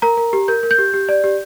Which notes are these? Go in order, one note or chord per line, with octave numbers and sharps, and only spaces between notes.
A#4 A#5
A#4
G4
A#4 G6
A#4
G6
G4
G4
D5
G4